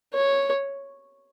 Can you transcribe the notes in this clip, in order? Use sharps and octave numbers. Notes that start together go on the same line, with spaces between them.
C#5